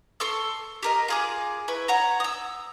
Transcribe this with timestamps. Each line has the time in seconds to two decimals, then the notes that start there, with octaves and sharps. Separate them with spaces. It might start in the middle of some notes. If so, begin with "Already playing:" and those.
0.20 A4 C6 C#6 E6
0.83 G4 A#4 D#5
1.08 F4 G#4 D6
1.68 E4 B4 C#6
1.88 C#5 F#5 A#5
2.20 D#6 E6